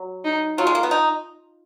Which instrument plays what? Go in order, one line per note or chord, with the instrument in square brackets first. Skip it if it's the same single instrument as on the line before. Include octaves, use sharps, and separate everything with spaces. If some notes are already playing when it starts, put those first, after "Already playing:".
Already playing: [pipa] F#3
[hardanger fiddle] D#4
[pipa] F#3 [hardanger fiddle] F4
[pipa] G#3
A#3
B3
D#4